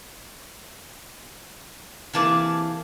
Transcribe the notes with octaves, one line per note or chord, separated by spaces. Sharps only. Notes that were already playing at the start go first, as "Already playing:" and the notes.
C3 E3 A#3 G#4 A5 D6